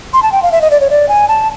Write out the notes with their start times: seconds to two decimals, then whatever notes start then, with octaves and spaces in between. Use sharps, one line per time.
0.13 C6
0.23 A5
0.32 G5
0.43 F5
0.52 E5
0.61 D#5
0.71 D5
0.80 C#5
0.90 D5
1.09 G#5
1.28 A5